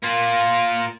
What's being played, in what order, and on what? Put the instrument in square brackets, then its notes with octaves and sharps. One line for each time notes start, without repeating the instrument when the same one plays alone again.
[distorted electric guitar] A#3 F4